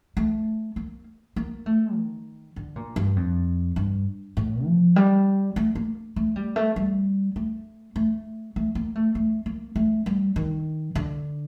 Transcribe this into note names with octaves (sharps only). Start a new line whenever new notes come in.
A3
A#3
A#3
A3
D#3
D3
A#2
G2
F2
G2
A2
F3
G3
A3
A#3
A3
G3
A3
G3
A3
A3
A3
A#3
A3
A3
A#3
A3
G3
D#3
D3